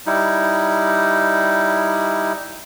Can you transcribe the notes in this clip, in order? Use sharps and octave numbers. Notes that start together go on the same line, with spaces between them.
G3 D#4 E4